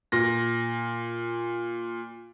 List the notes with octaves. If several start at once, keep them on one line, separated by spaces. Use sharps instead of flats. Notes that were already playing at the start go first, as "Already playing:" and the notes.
A#2 A#6